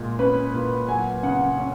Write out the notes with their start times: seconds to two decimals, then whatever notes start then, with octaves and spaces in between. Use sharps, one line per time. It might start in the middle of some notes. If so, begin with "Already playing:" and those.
Already playing: A#2 G#3
0.19 C#4 B4
0.54 A#2
0.88 F#3 G#5
1.23 C#3 F#5
1.58 C#4